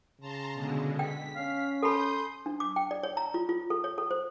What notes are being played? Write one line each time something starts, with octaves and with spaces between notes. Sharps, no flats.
C#3 A5 A#5 C6
B2 D3 G#3
G5 B6
C#4 F5
A4 A5 B5 C6 D#6 G6
D4
D6
G5
D5
C#5
A#5
F4
F4
A4
C#5
A4
C5